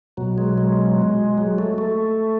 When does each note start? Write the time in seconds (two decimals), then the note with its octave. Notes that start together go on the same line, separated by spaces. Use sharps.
0.17 B2 F#3
0.38 G#3
0.58 G#3
1.38 F#3
1.58 A3
1.78 A3